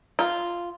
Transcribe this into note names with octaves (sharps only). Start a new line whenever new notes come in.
F4